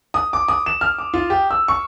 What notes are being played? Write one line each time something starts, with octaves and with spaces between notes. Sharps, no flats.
D#6
D6
D#6
E7
F6
D6
F4
G4
E6
C#6